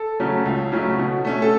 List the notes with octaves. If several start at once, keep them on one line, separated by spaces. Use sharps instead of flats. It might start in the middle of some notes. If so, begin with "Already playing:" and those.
Already playing: A4
C#3 F#3 A3 C#4
C#2
C#3 F#3 A3 C#4
B2
A3 C#4
A4